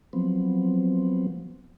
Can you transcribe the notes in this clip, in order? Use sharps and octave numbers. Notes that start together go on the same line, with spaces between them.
F3 F#3 B3 C4